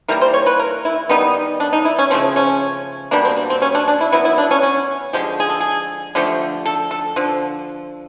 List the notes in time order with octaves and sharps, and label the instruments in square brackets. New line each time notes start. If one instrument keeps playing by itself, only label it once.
[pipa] E3 G3 A#3 A#4
C5
C#5
B4
A#4
E4
D#3 G3 B3 D#4
D4
D#4
E4
C#4
C#3 F3 A3 C4
C#4
B2 G3 A#3 D4
C4
D4
C4
C#4
D4
D4
E4
D#3 F#3 B3 E4
E4
D4
C#4
C#4
D3 F3 G#3 G4
G#4
A4
G#4
D3 F3 A3 G4
A4
A4
D3 F3